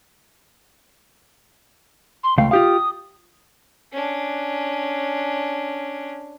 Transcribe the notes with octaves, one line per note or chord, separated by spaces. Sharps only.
C6
C#2 A3 F5 G5
F4 G4 F5 D#6
C#4 D4